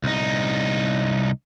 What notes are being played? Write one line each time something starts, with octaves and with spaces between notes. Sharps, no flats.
C2 D#4